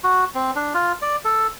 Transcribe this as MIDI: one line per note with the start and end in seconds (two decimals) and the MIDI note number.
0.04 0.25 66
0.35 0.51 60
0.55 0.74 62
0.74 0.93 65
1.02 1.16 74
1.25 1.47 69